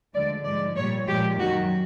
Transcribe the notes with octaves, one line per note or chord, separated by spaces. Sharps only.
D2 D3 F3 G#3 D5
G#2 F3 G#3 D5
A#2 G3 C#5
A#2 F3 G#3 G4
F#2 D#3 F#3 F#4